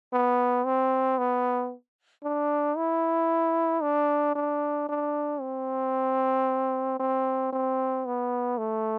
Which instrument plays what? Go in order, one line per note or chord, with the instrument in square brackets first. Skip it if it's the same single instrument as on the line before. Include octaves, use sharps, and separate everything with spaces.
[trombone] B3
C4
B3
D4
E4
D4
D4
D4
C4
C4
C4
B3
A3